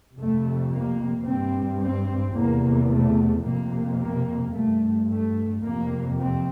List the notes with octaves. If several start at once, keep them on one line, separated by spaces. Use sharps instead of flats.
F2 C3 A3
A#3
G2 C4
C4
E2 C3 A#3
A3
F2 C3 A#3
A#3
G2 A3
A3
F2 C3 A#3
C4